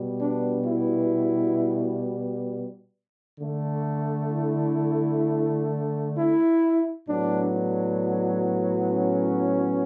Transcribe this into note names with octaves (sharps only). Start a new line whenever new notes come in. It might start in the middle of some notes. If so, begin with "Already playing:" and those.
Already playing: B2 G3 B3
D4
E4
D3 A3
E4
E4
A2 F#3 B3 D4
D4
C#4